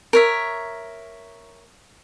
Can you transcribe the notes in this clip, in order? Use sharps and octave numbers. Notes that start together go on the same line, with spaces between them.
A#4 C#5 E5